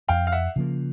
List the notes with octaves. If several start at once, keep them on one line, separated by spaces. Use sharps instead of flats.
F2 F5 G5
F5
E5 F#5
C#3 F3 A#3